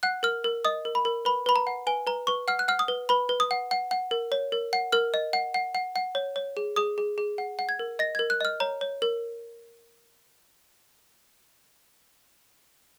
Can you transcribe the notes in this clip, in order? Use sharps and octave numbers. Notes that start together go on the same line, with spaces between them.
F#5 F#6
A#4 F6
A#4
D#5 D#6
A#4
B5
A#4
B4 B5
B4 B5
A#5
F#5
B4 G#5
B4 A#5
B4 C#6
F#5 F6
F#6
F#5 F6
D#6
B4
B4 B5
B4
D#6
F#5
F#5
F#5
A#4
C#5
A#4
F#5
A#4 F6
D#5
F#5
F#5
F#5
F#5
C#5
C#5
G#4
G#4 D#6
G#4
G#4
F#5
F#5
G#6
A#4
D#5 A#6
A#4 G#6
F#6
D#5 F6
C#5 A#5
C#5
A#4